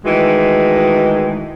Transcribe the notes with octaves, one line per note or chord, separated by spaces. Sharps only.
D#3 E3 G#3 A3 F#4